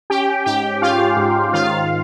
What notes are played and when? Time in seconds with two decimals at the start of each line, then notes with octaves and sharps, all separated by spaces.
0.10 C#4 G4 G5
0.46 G#2 G4 G5
0.81 C#4 F4 F5
1.17 G#2
1.53 D#3 F4 F5